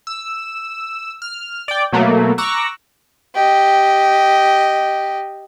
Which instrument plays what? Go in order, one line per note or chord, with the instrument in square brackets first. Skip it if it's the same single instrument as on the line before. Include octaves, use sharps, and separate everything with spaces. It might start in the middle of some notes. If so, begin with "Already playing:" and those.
[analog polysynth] E6
F6
D5 G5
B2 F#3 A3 A#3
A#5 C#6 D6 E6 F#6 A#6
[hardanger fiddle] G4 D#5